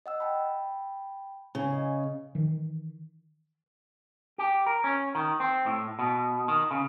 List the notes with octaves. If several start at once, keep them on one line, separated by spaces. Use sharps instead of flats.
D#5 F#5 E6
G5 A5 B5
C#3 G#5
D#5
D#3 E3
G4
A#4
C#4
D#3
C4
A2
B2
D#3
C#3